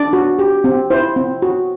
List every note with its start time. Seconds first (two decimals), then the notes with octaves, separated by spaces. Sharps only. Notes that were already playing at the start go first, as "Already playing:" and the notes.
Already playing: D4 D5
0.13 F#4
0.39 G4
0.64 C4
0.90 E4 C5
1.16 C4
1.42 F#4